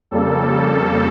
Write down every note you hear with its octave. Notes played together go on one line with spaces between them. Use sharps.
F2 C#3 G3 A#3 A4